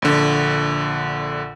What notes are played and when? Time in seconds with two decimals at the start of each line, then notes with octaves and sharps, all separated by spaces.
0.02 A#1 D3